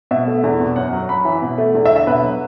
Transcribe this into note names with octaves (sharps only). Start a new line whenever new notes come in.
B2 E5
A3
E2
B2
F#2 F#5
F#3
F#2 B5
E3
B2
A3
E2
E5
D3
E5
B2 B4
F#3